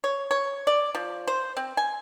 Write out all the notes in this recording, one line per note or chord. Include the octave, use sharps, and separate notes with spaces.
C#5
C#5
D5
F3
C5
C4
G#5